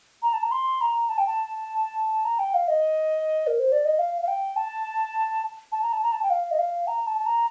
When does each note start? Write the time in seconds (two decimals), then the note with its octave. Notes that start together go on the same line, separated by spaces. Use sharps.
0.22 A#5
0.33 A5
0.42 A#5
0.51 C6
0.81 A#5
1.09 A5
1.18 G5
1.27 A5
2.24 A#5
2.39 G5
2.54 F5
2.68 D#5
3.47 A#4
3.59 C5
3.72 D5
3.85 D#5
3.98 F5
4.22 F5
4.28 G5
4.56 A5
5.72 A5
5.82 A#5
5.92 A5
6.03 A#5
6.12 A5
6.23 G5
6.30 F5
6.51 D#5
6.58 F5
6.87 A#5
7.07 A5
7.19 A5
7.26 A#5